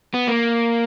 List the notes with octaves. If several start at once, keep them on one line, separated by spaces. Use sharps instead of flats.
B3
A#3